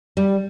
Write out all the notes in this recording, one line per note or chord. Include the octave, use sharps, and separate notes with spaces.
G3